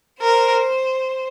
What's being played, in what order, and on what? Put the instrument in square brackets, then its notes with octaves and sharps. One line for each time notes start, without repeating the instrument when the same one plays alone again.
[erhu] A#4 [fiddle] C5